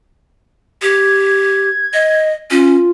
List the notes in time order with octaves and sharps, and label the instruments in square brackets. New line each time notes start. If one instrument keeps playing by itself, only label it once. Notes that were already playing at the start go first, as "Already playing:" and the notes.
[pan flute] G4 [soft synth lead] G#6
[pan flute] D#5
[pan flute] C#4 [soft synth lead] F4